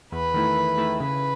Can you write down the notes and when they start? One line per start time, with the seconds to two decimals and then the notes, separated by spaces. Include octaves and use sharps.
0.12 E2 B4
0.34 D#3 A3 E4
0.56 E2
0.78 D#3 A3 E4
1.00 C#3 B4